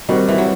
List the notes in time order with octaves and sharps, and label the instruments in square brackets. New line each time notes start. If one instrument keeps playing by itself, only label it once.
[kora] D#3 [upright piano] G3 C4 F#4
[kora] E3
F#3